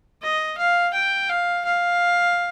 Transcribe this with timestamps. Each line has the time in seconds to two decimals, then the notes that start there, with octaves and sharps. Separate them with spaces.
0.22 D#5
0.58 F5
0.94 G5
1.29 F5
1.65 F5